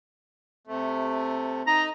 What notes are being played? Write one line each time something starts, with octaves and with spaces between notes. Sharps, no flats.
C3 A3
D#4 D#5 A#5